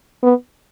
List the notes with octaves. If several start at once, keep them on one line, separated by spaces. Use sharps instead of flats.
B3